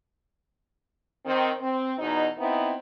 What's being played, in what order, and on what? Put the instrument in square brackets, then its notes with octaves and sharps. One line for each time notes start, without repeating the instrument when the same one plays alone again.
[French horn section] D#3 C4
C4
E2 B2 D#4
B3 C4 D#4 E4